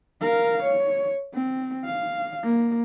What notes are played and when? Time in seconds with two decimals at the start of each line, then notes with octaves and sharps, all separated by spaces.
0.21 A#4 F5
0.63 C#5
1.34 C4
1.85 F5
2.44 A#3